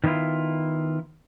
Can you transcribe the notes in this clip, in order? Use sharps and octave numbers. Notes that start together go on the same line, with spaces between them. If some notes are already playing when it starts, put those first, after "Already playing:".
D#3 F#3 B3 E4 F4